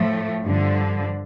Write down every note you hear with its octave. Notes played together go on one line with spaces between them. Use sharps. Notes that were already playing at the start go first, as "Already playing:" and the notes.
Already playing: A2 F3 A3
G2 D3 F3